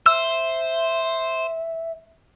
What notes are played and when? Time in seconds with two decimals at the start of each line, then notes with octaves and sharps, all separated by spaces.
0.06 C5 E5 E6